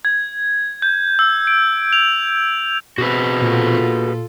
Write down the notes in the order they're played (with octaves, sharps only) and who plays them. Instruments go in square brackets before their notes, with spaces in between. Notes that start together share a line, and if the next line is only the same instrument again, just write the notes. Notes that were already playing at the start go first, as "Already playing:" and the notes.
[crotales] G#6
G6
E6
D7
F7
[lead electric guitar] B2 C4 [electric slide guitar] F#4 G#4 B4
[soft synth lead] A#2 [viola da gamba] F4 A4